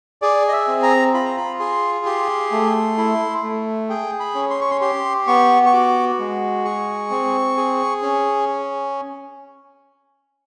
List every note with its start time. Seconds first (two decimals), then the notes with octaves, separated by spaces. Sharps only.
0.22 G#4 D5
0.48 D#5
0.53 E5
0.68 C4
0.83 A#5
1.14 F4 B5
1.25 A#5
1.37 B5
1.59 G#4 C6
2.06 G4 C6
2.52 A3
2.98 E4
3.43 A3
3.89 G#4 G5
4.20 B5
4.35 C#4
4.50 C6
4.61 C#6
4.71 C6
4.81 G4 C6
5.27 B3 C#6
5.66 C#6
5.73 F#4 D6
6.19 G#3
6.65 G#4 C#6
7.10 C4
7.57 G#4
8.02 C#4